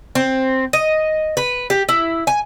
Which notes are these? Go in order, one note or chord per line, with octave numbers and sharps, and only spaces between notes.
C4
D#5
B4
G4
E4
G#5